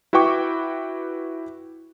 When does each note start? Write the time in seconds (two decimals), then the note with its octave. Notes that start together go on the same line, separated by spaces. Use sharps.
0.13 E4 F#4 B4 G5 C#6 D6